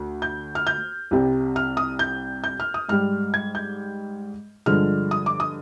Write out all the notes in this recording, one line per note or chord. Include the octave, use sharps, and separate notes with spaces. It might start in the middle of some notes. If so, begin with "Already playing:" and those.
Already playing: D2
G6
F6
G6
C2 C3 G3
F6
D#6
G6
G6
F6
D#6
G#2 G3 F6
G#6
G6
G2 D3 F3 G#3 F6
D#6
D6
D#6